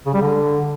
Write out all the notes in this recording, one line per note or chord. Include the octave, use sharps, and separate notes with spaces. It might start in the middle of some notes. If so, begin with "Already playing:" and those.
C#3
G3
D3